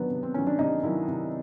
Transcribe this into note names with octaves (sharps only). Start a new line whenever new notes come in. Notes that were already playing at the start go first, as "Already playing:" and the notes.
Already playing: C3 D#3 F#3 B3 D4
C3
C4
D#3 F#3 C#4
D4
C3 D#4
D#3 F#3 E4
C3